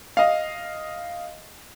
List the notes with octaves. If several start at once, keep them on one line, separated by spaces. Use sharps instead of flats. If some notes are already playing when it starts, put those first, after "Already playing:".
D#5 F5